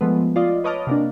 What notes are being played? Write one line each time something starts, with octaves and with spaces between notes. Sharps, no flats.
F3 G#3 A3 B3
F4 D5 D#5
B4 C#5 D#5 A5 D6 F6
C3 A#3 D4